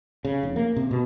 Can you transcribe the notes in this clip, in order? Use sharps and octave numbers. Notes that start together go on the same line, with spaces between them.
C#3
F1
A#3
C3
B2